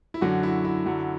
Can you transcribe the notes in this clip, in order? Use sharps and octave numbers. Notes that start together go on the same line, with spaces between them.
E4
F#2 D3 F#3 F#4
E4
E4
F#2 D3 F#3